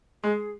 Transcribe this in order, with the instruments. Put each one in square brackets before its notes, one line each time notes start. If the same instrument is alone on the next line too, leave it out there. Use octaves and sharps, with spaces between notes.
[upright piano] G#3 [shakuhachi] G#4